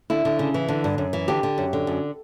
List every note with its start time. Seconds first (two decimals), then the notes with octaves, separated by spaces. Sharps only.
0.10 D3 E4
0.25 D3
0.39 C#3
0.54 E3
0.68 D3
0.84 G2
0.98 F#2
1.13 E3
1.28 D3 G4
1.43 D3
1.58 F#2
1.73 D3
1.87 F#2